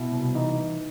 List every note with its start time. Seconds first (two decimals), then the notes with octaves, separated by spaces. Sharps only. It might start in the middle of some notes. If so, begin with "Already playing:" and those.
Already playing: B2 E4
0.12 C2
0.35 E3 D#4